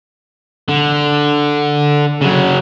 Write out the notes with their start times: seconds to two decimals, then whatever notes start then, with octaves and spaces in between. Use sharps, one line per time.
0.68 D3
2.21 C#3 F#3